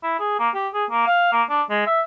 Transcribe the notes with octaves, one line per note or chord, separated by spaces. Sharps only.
E4
G#4
A#3
G4
G#4
A#3
F5
A#3
D4
G#3
E5